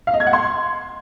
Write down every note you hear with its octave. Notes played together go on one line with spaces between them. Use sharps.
F5
D#5
G#6
F#5
C6